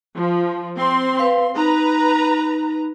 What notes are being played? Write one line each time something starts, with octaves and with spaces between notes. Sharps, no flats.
F3
C4 C6
B4 F5
D#4 B4 A#5